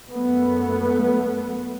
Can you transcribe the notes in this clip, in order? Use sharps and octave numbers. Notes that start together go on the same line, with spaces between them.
F#2 A3 B3